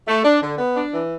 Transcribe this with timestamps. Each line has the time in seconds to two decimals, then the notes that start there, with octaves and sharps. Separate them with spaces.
0.07 A3
0.24 D4
0.42 D3
0.58 B3
0.76 D4
0.93 E3